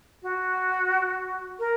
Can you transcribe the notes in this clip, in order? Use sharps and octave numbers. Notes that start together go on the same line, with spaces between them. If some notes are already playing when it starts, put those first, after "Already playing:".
F#4
A#4